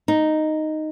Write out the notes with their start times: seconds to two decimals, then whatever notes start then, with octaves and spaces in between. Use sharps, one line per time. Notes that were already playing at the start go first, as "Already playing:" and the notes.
0.08 D#4